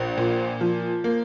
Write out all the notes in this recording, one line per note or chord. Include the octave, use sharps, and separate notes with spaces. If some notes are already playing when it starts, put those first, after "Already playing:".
Already playing: A#1
A#2
F3
A#3